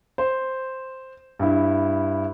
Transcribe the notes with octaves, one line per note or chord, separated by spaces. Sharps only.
C5
G2 E4